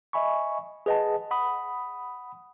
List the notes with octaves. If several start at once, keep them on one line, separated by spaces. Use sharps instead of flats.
D#5 E5 G#5 B5 C#6
G#4 B4 D#5 F#5 A5
F#5 B5 D#6